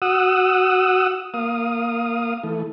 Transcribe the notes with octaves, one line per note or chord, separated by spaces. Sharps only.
F#4 F#5 D#6 E6
A#3 F5 D#6
E3 A3